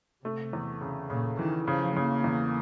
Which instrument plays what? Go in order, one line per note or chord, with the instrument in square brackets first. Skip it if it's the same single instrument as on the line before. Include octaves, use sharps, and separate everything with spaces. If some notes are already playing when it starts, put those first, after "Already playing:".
[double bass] C3 [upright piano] A3
[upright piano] E2
C#3
[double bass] A#2 [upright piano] C#3
[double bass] D#3 [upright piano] E3
[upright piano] C#3 [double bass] F3
[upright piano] C#3 [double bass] A#3
[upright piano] E2